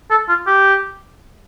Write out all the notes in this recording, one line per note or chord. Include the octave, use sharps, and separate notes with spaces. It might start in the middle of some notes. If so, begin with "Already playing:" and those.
A4
F4
G4